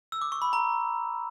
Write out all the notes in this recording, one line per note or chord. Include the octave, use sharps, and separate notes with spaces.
E6
D6
C#6
B5
A#5